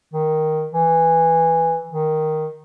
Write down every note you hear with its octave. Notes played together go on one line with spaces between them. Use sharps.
D#3
E3
D#3